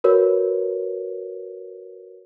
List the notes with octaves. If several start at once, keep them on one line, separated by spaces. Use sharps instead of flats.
F#4 A#4 B4 C#5